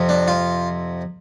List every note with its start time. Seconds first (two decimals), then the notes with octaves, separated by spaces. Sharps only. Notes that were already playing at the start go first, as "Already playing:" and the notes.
Already playing: F2 C3 F3
0.09 D4
0.28 F4